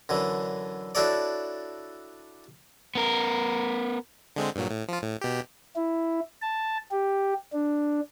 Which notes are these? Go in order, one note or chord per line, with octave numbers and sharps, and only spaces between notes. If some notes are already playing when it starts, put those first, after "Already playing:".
F#2 D3 E3
D4 E4 F#4 A4 C#5 D5
B3 A#4
D3 G#3 C4
G2 A#2 F#3
A2
F3 F4
A2
B2 G4
E4
A5
G4
D4